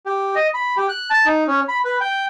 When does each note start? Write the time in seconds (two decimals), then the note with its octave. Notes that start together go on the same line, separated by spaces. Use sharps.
0.06 G4
0.36 D#5
0.54 B5
0.77 G4
0.89 F#6
1.10 A5
1.26 D#4
1.48 C#4
1.68 B5
1.85 B4
2.01 G5